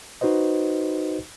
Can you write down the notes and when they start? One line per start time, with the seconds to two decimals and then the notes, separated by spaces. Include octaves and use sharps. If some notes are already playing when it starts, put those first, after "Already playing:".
0.21 D#4 F#4 B4 C5 D#5